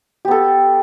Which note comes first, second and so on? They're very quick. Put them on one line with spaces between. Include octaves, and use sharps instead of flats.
G4 B3 A4